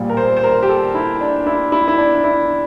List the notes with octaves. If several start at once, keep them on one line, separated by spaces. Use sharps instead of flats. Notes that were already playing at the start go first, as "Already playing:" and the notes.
Already playing: A#1 A#2 G3
A#4
C5
C5
A#4
G4
A4
E4
D4
E4
E4
E4
D4
E4